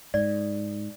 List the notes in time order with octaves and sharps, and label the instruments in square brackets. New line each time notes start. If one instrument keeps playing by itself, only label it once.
[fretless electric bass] G#2 [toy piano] D5